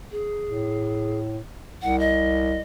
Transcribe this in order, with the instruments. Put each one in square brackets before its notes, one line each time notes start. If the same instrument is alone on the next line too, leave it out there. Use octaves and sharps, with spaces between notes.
[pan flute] G#4
[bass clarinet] A2
[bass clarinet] C2 [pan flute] F#5
[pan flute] D#5